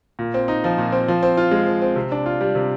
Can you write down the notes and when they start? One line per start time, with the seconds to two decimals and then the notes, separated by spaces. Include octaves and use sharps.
0.19 A#2
0.34 C4
0.48 D#4
0.64 F3
0.78 A#2
0.92 C4
1.08 F3
1.23 C4
1.37 F4
1.51 G#3
1.67 F3
1.82 C4
1.96 C3
2.12 D4
2.26 F4
2.41 G3
2.55 C3